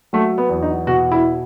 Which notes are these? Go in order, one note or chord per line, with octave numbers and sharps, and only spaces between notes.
F#3 A3
B3
E2
D#4
B2 F#4
E4